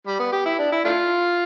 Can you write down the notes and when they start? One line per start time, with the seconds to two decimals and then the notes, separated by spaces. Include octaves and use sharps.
0.07 G3
0.19 B3
0.33 G4
0.46 E4
0.59 D4
0.72 E4
0.85 A3 D4 F4